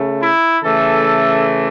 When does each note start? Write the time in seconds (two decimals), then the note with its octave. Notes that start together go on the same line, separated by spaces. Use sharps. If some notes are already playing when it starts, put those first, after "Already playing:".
Already playing: C#3 A3
0.21 E4
0.64 C#3 E3 A3 A4